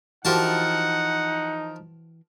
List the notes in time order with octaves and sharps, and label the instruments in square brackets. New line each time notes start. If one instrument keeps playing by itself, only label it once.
[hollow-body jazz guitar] E3 F#4 G4 [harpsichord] F3 A#4 A5 [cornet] D#4 [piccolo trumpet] F#5